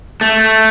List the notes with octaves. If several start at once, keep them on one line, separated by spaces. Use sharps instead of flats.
A3